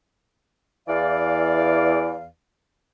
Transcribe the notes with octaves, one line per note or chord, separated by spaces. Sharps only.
E2 E3 D5 F5